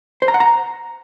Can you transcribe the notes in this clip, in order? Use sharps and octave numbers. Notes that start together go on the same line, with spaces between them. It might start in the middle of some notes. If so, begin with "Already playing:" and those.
C5
A#5
F#5
A#5